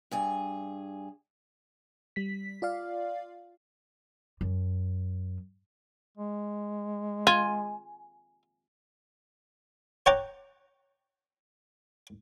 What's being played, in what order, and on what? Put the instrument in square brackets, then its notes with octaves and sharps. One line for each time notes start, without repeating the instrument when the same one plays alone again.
[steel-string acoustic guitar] G2 G#4 G#5
[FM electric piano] G3 B6
F4 D5 F5
[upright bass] F#2
[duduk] G#3
[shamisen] F4 [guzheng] G#5
[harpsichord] C#5 F#5 G5 A#5 D6